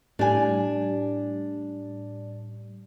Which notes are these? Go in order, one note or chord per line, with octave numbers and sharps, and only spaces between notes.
A2 G3 D4 G#5